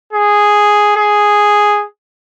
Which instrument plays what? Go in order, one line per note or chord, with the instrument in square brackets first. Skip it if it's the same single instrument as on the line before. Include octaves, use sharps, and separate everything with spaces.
[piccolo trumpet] G#4
G#4